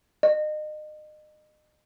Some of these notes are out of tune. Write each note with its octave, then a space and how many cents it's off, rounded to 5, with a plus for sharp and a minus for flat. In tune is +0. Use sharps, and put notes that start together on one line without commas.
D#5 -35